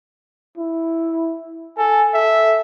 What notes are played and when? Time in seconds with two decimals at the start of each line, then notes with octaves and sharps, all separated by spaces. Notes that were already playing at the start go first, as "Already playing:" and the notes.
0.57 E4
1.78 A4 G#5
2.14 A4 E5